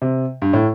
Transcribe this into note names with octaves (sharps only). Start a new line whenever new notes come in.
C3
G2
A2